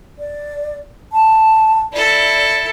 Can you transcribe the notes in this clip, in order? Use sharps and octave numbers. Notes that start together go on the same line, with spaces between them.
D5
A5
E4 A4 D5